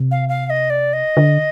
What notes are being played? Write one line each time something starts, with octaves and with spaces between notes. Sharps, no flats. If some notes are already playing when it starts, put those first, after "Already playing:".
Already playing: C3
F5
F5
F5
D#5
D5
D#5
D3